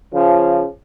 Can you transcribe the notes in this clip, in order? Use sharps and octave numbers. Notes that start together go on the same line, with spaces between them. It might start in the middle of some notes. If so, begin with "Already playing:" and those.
C#3 F3